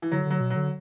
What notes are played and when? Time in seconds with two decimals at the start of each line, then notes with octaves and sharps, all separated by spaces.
0.02 E3
0.12 D3 F#3
0.26 D3 F#3
0.40 B2
0.50 F#3
0.56 D3